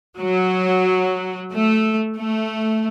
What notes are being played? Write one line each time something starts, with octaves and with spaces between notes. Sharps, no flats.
F#3
A3
A3